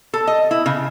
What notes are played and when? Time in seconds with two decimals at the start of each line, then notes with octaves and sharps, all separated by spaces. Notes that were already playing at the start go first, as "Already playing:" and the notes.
0.14 A4
0.27 D#5
0.51 E4
0.66 C#3